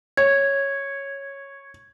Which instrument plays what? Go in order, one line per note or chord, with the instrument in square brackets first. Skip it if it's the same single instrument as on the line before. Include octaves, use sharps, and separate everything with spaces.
[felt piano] C#5 [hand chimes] G#6